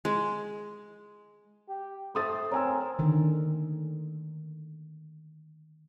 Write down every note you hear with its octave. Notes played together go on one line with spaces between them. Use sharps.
G#3
G4
A3 A4 C5 D#6 A6
C4 A#4 C#5 G#5 E6
D3 D#3